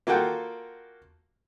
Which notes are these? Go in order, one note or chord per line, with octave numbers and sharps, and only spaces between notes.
A#3 F4 F#4 A4 F#5 G5